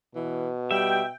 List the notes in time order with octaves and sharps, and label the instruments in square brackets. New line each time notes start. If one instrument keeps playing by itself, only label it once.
[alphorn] B2 [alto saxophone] E3
[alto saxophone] G3 [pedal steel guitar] E5 [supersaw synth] G5